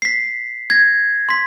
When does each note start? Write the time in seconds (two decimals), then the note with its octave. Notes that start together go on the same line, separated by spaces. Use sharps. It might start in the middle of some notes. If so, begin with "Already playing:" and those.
0.02 B6 C7
0.70 G#6 A#6
1.29 C6 B6